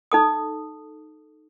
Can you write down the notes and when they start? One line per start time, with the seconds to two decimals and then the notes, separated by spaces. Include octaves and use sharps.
0.12 D#4 A4 D#6